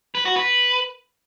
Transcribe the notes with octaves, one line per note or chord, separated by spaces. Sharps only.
B4
F#4
B4